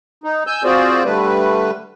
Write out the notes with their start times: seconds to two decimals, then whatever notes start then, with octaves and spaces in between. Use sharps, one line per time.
0.24 D#4
0.47 G#5 E6 G6
0.64 C4 F4 F#4 G#4 C5 D5
1.05 D3 G3 A3 B4